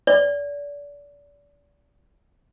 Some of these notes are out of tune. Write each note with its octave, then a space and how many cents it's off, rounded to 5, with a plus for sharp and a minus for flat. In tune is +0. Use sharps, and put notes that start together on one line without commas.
D5 -30